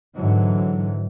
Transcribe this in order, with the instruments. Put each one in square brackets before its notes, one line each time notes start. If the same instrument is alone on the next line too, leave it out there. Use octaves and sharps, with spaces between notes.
[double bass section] G#2 D3 E3 F#3